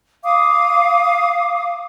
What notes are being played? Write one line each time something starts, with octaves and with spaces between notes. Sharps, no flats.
F5 D6 D#6